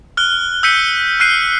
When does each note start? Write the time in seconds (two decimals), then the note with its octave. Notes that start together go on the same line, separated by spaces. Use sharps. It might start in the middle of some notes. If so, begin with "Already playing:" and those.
0.17 F6 F#6 G7
0.63 E6 G6 B6 C#7 D#7
1.20 F6 F#6 C7 D#7